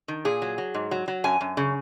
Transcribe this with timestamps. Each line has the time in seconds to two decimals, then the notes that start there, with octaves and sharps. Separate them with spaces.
0.08 D#3
0.25 A#2 G#4
0.42 F#3
0.58 F#3
0.74 G#2
0.91 F#3
1.08 F#3
1.24 F#2 G#5
1.41 F#2
1.57 C#3